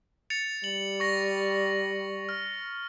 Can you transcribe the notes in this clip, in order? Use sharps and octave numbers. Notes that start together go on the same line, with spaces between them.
A6 C#7 F7
G3 F#7
C#6 A#6
F6